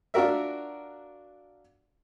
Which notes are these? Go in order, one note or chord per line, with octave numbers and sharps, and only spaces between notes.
D4 F4 F#4 A#4 E5